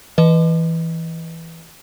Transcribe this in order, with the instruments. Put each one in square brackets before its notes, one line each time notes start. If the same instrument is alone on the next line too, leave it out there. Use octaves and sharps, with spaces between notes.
[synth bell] E3 B4 D#5